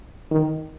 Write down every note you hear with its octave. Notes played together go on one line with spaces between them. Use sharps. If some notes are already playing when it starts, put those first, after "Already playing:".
D#3